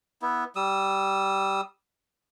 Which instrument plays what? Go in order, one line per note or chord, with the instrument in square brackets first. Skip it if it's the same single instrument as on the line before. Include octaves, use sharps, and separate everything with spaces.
[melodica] B3 E4
G3 D#6 E6